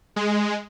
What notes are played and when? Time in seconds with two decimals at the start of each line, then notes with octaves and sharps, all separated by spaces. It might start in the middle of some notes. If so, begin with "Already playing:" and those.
0.16 G#3